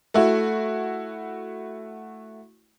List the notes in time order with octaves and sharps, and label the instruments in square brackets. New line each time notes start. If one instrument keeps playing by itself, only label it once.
[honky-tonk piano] A3 E4 F#4